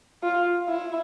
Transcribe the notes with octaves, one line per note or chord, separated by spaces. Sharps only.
F4
E4